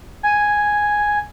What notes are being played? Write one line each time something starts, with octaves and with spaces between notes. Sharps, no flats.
G#5